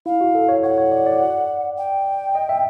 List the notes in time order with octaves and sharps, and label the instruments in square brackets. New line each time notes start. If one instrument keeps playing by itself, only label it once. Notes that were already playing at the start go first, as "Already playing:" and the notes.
[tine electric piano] E4 [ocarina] F5
[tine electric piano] F#4
A4
C#5
[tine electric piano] C#5 [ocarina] F#5
[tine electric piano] C#5
D5
D5
[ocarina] G5
[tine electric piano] D#5
E5